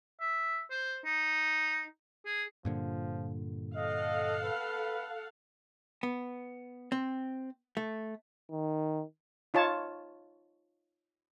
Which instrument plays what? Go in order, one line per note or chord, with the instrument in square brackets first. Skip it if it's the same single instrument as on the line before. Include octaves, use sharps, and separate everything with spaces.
[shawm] E5
C5
D#4
G#4
[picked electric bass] G2 A#2 D3 [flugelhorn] F3
[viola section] A4 F5 F#5 [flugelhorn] D#5
[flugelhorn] B4
[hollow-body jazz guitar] B3
C4
A3
[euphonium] D#3
[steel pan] D#4 F4 C#5 A5